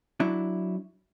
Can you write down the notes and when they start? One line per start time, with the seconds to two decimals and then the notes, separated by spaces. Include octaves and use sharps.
0.20 F#3 D4 E4